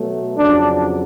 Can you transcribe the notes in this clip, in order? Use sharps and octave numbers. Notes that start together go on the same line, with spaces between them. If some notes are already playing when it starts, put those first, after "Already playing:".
Already playing: B2 F#3 A3
F2 C#3 F#3 D4